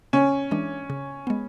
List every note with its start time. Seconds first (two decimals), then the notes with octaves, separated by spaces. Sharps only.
0.13 C#3 C#4
0.51 E3 G#3 D4
0.90 C#3
1.27 G#3 B3